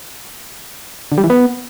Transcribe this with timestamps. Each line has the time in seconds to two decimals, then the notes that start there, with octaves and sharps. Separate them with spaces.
1.12 D3
1.18 G3
1.24 E3
1.30 B3